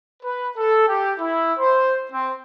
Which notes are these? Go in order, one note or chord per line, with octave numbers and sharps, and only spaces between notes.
B4
A4
G4
E4
C5
C4